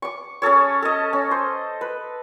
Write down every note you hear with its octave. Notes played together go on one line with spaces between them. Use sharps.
C#6 D6
C#4 G#4 A4 C#5
A4 D#5
C#4
C5
B4